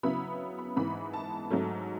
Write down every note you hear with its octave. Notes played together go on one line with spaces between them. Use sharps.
C#3 F#3 B3 E4 B5
B5
G#2 E3 B3 B5
A5
G#2 F#3 A3